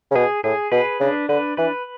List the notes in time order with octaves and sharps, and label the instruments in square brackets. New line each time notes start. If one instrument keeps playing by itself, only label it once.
[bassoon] C#3
[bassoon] B2 [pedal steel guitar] G#4
[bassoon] A2 [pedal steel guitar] G#4
[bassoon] B2 [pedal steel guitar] B4
[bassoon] C#3 [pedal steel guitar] D4
[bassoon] D3 [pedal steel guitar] B4
[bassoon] E3 [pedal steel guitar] B4